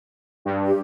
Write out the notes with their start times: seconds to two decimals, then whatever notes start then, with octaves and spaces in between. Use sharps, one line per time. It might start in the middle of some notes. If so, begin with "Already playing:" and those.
0.45 G2
0.66 G4